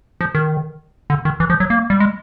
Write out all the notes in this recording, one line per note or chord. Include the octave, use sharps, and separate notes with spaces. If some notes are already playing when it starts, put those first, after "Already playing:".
F3
D#3
D3
D#3
E3
F3
F#3
A#3
G3
G#3